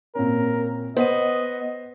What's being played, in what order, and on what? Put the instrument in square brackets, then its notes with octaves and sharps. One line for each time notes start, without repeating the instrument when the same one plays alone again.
[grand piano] A#2 C4 C#4 [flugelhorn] A#4
[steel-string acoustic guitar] B3 [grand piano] C5 F#5 D#7 [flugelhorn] D#5